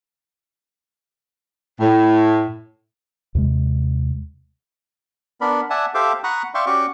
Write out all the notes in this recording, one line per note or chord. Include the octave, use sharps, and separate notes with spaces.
A2
D#2 C3 G#3
B3 D4 A#4 D5 B5
D5 E5 F#5 G#5 A5
G4 A4 C5 E5 F5 D6
F#5 A#5 B5 C#6 D#6 F#6
D5 E5 F5 G5 C6 C#6
C#4 F#4 G4 D5 C#6 D6